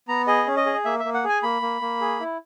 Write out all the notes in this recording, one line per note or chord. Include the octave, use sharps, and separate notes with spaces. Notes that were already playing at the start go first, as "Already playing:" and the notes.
B3 A#5
G#4 D#5
C#4
D#5
G#4
A#3 E5
E5
A#3
F#5
G#4 G#5
A#3 B5
A#3
A#3
G#4
E4